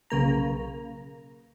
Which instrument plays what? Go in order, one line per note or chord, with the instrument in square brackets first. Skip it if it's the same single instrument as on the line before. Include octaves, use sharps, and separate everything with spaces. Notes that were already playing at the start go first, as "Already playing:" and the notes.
[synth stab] B1 C#3 A#3 A#5